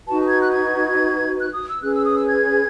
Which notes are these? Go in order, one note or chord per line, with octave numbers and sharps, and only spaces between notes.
D#4 F#4 B4 A5
G#6
F#6
G#6
F#6
D#6
E6
C#4 G#4 B4 F#6
E6
D#6
E6
G#6